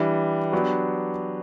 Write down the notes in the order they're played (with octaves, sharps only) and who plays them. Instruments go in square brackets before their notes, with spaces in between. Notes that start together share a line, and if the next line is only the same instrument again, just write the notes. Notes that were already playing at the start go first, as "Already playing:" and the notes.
Already playing: [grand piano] E3 G3 D4
F#3 B3 D4 G4